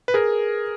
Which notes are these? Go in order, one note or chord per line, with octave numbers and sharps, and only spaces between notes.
B4
G#4 A#4